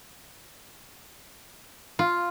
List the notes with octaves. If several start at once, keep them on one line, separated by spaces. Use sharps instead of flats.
F4